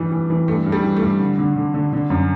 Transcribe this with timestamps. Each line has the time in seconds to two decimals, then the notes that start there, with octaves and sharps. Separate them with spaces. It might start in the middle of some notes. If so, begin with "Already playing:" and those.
Already playing: G2 E3 G3
0.12 E3
0.30 E3
0.48 G2 A3
0.66 G2
0.72 G3
0.84 E3
0.96 A3
1.03 G2
1.20 D3
1.38 D3
1.56 D3
1.74 D3
1.93 D3
2.10 F#2